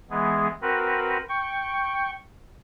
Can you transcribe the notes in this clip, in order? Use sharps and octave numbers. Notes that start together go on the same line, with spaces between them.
E3 G#3 B3 G#4
C4 F#4 A#4 B4
G5 C#6